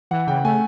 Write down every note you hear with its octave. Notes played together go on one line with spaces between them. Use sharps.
E3 F#5
C#3 G5
A3 G#5